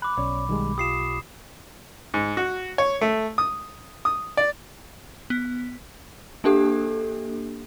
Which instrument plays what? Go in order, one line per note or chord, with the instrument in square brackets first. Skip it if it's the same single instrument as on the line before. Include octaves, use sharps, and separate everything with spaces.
[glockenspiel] B5 D6 [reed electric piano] F#6
[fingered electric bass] B1 [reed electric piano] C#4 C#5 D5
[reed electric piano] D#3 G3 G#3
[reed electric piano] F4 G4 [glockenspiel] D#6 C7 E7
[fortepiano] G#2
F#4
C#5
A3
D#6
D#6
D5
[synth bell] B3
A#3 D4 G4 A4